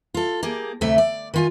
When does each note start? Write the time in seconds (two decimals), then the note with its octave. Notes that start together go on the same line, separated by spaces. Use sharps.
0.14 F4 A4
0.43 A#3 G4 G#4
0.81 D2 C3 A3 E5
0.98 D5
1.34 D#3 F4 G#5